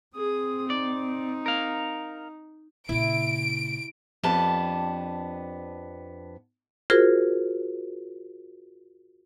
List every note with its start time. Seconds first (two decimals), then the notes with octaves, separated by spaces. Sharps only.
0.16 C4 G#4 D#6
0.70 D#4 D5
1.46 A#4 F5
2.89 A#2 C#3 E4 D7
4.23 F2 B3 D4 G4 A5
6.90 F4 F#4 G#4 A#4 C5